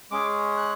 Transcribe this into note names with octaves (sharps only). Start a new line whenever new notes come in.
G#3 C#4 G#4 D6
F#6